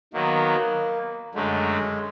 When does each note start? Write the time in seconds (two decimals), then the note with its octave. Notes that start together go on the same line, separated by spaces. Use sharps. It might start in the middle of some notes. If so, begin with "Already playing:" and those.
0.13 D#3 F#3 A#3 B3
1.34 F#2 D3 F#3 G#3 A3